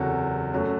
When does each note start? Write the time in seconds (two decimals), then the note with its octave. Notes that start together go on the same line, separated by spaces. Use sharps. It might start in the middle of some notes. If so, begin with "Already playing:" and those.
Already playing: F#1 E2 C3 F#3 F#4 A4
0.53 F#2 F#3 A3